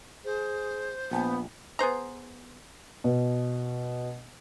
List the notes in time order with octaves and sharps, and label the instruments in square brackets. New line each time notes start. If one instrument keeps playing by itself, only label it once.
[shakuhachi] G#4 [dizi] C5
[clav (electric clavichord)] A#1 [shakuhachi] B3
[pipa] B3 G#4 C5 A#5
[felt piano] B2